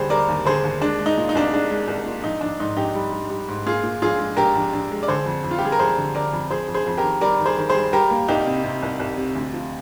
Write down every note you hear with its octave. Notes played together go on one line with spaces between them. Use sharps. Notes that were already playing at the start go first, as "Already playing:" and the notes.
Already playing: D#2 D3 G3 G4 G#4 C5
G3 A#4 D5
D#2
D3 G#4 C5
D#2
G#3 D4
G#3
D#4
A#2
D#4
C2 D4
G#3 D4
G#3
C2
A#2
A#1 D#4
A#1 D4
G#2 D#4
A#1 D#4 G4
G3
G3
G3
G#2
A#2 F4 G#4
A#2
A#1 F4 G#4
G#3
A#1 G4 A#4
A#1
A#1
G#3
D5
D3 G#4 C5
F2
F2
F4
G4
G3 G#4
A#4
F2 G#4 C5
D3
D3 A#4 D5
F2
F2 G#4 C5
F2
G#4 C5
F2
G4 A#4
D#3
G3 A#4 D5
D#3
G#4 C5
D#3
G#4 C5
G3
G3 G4 A#4
A#3
C2 D#4 G4
C3
C3
C2
C2
C3
D2
F3